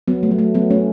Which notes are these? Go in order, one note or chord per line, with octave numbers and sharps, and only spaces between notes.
F#3 B3
A3
F#3
A3
F#3 B3
A3 C#4